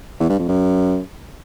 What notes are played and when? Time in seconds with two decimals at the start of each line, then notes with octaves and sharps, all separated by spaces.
0.20 E2
0.29 G2
0.39 F2
0.49 F#2